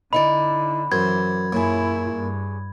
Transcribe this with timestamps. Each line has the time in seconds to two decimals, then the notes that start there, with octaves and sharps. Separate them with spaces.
0.13 D3 D#4 E4 D5 B5
0.92 F#2 E3 C5 G#6
1.53 F#2 A#2 E4 G#4 C#5
2.14 G2